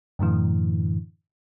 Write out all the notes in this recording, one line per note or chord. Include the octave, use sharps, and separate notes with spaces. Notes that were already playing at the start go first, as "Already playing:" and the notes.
F#2 A2 D3 E3